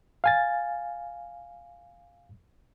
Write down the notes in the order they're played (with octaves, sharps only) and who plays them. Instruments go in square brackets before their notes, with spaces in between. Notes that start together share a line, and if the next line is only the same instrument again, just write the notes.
[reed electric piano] F5 G#5 A6